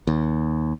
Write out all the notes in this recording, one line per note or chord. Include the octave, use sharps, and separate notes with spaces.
D#2